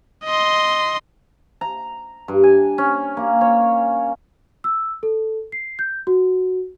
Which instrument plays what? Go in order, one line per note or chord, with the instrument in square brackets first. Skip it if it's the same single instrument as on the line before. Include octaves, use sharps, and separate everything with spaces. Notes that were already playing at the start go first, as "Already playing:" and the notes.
[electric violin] D#5 C6
[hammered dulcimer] A#5
G2
G#5
C#4
A#3
C#5
[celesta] E6
A4
C7
G6
F#4